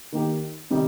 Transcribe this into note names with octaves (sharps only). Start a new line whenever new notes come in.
D#3 A#3 D#4 G4
C3 D#3 G3 D#4 G4